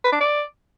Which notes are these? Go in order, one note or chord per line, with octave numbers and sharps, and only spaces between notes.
B4
D4
D5